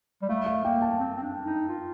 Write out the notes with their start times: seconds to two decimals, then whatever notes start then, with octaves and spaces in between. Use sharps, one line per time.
0.22 G3
0.29 A3 F5
0.46 F5
0.64 A#3 G5
0.82 A5
0.99 C4
1.17 C4
1.22 D4
1.45 D#4
1.69 F4